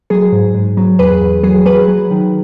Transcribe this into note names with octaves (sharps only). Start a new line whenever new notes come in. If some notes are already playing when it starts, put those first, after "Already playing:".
F#3 G#4
G#2
G#2
F#3
E2 G#4 B4
E2
F#3 G#4
F#3 G#4 B4
F#3
D#3